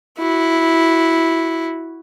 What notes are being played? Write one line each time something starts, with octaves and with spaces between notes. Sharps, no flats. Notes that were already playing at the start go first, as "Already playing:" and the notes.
E4 F#4